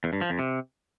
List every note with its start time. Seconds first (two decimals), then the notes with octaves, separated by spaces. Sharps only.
0.04 E2
0.13 G2
0.21 F3
0.30 F2
0.39 C3